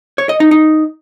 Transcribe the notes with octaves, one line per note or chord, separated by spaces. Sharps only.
C#5
D#5
D#4
D#4